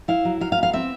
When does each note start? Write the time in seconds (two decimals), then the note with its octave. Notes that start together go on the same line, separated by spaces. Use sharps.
0.08 E4 F5
0.25 F#3
0.41 F#3 F5
0.52 F5
0.57 B3
0.63 F5
0.73 C4 E5